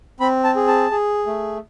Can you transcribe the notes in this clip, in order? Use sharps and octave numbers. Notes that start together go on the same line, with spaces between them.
C4 B5
A5
G#4
A5
G#4
A3